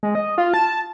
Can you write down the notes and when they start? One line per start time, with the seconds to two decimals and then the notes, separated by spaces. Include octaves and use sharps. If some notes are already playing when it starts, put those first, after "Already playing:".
0.03 G#3
0.15 D#5
0.38 F4
0.54 A5